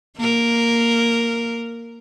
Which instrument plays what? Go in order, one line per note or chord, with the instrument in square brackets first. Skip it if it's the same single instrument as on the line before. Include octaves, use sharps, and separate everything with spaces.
[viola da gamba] A#3 A#4